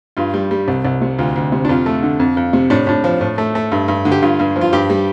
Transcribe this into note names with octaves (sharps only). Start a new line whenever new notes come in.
G2 F4
G3
G3
C2
C2
C3
D2 F4
D2
C3
D4
F2 F4
A3
D3
F2
F2
C3
A2 D4
A2 D4
F3
A2
A3
A3
G2
G2
D3
G4
G2 F4
G2
F3
F4
G2 G4
G3